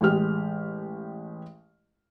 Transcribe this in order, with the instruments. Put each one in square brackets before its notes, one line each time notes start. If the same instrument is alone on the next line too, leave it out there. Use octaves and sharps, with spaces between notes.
[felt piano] A1 G#3 G4 F6